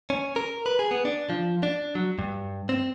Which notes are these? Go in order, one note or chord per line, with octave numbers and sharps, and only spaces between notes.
C#4
A#4
B4
G#4
B3
D4
F3
D4
F#3
G2
C4